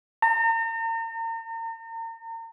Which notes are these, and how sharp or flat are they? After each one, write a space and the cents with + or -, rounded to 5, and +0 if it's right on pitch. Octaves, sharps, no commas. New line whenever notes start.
A#5 -40